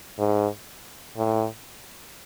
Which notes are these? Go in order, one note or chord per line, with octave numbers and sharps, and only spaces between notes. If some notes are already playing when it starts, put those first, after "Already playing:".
G#2
A2